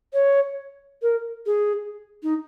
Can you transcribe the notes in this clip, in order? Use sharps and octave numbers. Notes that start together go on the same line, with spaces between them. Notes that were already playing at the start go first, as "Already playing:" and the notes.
C#5
A#4
G#4
D#4